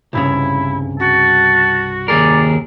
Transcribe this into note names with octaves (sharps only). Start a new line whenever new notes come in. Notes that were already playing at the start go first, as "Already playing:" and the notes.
C2 G2 C#3 E4
F#4 A5
D#2 G#4 A#4 D5